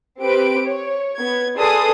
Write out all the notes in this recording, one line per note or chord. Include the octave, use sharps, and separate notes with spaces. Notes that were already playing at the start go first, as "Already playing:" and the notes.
C4 G4 B4 D7
C#5
B3 G#6
G#4 A4 B4 D5 C6 D#6